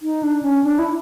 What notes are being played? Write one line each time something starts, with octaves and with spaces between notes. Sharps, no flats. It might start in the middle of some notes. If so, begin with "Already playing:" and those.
D#4
D4
C#4
D4
E4